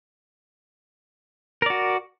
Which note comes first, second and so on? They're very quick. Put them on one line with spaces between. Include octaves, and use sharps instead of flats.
A#4 D5 F#4